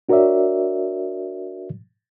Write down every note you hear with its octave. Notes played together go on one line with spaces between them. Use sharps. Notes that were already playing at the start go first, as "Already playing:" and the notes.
D4 F#4 A#4 C#5 D5 E5